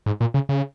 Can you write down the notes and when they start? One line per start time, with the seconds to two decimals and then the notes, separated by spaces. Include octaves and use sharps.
0.06 G#2
0.21 A#2
0.34 C#3
0.49 C#3